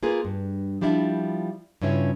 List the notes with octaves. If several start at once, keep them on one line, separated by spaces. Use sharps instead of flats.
A#3 F4 G#4 B4
G2
F3 G3 D4 E4 F4
G2 C#3 C#4 E4 F4 C#5